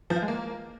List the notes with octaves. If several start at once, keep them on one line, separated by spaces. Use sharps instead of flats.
F3
F4
G#3
A#3